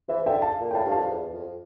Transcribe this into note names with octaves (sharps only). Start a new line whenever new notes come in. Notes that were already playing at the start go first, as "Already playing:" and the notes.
E3 C5 E5
D3 E5 G5
F5 A5
A#2
A2 F5 G5 A5
G2
F5 A5
F2
E2
F2